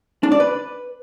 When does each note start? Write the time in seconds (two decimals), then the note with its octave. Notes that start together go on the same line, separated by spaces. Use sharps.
0.23 D4
0.32 D5
0.40 B4